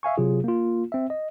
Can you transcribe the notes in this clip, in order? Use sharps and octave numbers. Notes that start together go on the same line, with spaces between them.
E5 F5 G#5 C#6
C3 F#3 F4 G#4
A#3 F4
C4 E5
D#5